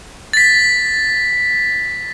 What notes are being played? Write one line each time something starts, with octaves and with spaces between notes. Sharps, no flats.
A6 B6